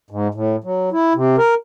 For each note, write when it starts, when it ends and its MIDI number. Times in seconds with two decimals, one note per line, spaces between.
0.11 0.28 44
0.34 0.56 45
0.64 0.90 54
0.92 1.13 64
1.15 1.36 48
1.38 1.54 70